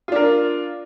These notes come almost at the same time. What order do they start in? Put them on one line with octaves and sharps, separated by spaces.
F4 D4 A#4